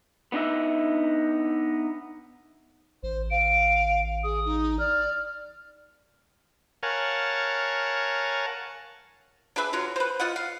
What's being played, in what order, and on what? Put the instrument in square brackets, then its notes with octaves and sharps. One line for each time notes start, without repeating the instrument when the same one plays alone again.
[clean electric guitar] B3 D4 D#4 E5
[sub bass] A1 [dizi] C5
[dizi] F5 [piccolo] D7
[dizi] G#4 [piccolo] D#6
[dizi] D#4
[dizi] D5 [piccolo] F6
[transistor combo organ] A#4 C#5 F5 F#5 G#5 A5
[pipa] D4 G#4 B4 E5
D3 F#3 F4
B4 C5
F4 D#5 F#5
F5